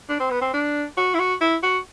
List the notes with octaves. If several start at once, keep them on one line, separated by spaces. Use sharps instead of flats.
D4
C4
B3
C4
D4
F#4
E4
F#4
E4
F#4